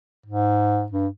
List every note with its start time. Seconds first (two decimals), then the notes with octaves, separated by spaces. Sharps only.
0.26 G#2
0.92 G2